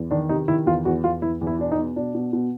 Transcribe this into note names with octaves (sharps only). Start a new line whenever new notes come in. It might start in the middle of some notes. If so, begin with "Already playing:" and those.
Already playing: E2
D#3 D4
C3 D#4
D#3 E4
E2 F4
E2 F#4
E2 F4
E2 E4
E2
E4
B2 D4
D#4
B2
B2 D4
B2
B2